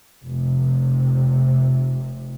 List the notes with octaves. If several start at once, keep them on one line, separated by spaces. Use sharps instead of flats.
F1 C3